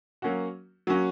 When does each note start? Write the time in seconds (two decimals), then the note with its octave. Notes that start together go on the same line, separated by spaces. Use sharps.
0.22 F#3 A#3 C#4 F#4
0.87 F#3 A#3 C#4 F#4